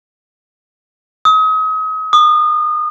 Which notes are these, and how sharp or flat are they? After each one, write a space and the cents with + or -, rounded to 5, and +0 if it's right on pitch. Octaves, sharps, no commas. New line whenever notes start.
D#6 +35
D#6 -30